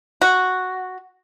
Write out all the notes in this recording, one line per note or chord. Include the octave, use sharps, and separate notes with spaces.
F#4